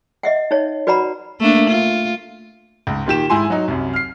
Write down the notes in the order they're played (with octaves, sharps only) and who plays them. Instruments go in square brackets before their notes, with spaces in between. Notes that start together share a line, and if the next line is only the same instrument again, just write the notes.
[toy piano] D#5 E5 F#5
D#4 C#5
F#4 B4 D5 F#5 A#5 B5
[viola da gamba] A3 A#3 D4
F4
[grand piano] C#2 G#2
A#2 D#3 G4 E7
G#2 E4 G#5 C6
F#3 D#4
C2 F#2
F6 C7